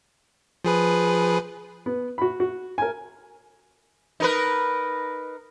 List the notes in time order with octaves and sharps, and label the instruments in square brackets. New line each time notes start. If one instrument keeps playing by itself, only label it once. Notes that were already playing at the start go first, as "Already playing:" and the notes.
[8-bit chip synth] F3 G#4 B4
[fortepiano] B3
F#4 B5
F#4
A#4 G#5
[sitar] D#4 A#4 B4